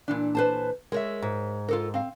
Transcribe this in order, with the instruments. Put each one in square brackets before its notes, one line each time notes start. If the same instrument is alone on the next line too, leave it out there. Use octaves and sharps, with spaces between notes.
[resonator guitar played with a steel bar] A#2 E3 D4
[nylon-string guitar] B4 C5 A5
[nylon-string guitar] G#3 [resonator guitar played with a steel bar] A#4 C#5 E5
[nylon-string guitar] G#2
[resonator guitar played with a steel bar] F4 A4 A#4
C4 F5